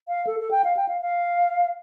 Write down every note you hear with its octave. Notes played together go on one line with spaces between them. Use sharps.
F5
A4
A4
G5
F5
G5
F5
F5